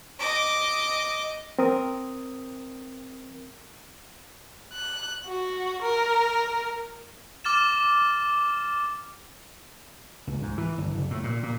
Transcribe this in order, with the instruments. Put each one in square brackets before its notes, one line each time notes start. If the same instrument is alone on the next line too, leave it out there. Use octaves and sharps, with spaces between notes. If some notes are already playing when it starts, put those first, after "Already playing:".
[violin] D#5 D6
[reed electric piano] C4 A#4 D#6
[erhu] F#6
F#4
A#4
[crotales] D6 F6 A6 E7
[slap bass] C#2
G#2
E3
G1
F#1
A2
A#2
A#2